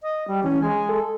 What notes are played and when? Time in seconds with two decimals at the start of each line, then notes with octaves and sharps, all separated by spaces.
0.02 D#5
0.28 G3
0.43 E3 C#4
0.62 G#3 G#5
0.89 A4